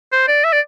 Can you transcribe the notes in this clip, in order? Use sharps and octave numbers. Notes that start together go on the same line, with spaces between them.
C5
D5
E5
D5